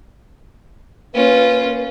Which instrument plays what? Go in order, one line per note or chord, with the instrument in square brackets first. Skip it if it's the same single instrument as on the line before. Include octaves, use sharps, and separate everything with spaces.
[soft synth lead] A#3 [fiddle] C#4 F4 [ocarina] B4